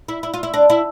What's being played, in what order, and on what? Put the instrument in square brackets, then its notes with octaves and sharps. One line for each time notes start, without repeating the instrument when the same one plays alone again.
[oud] E4
E4
F4
E4
D4
E4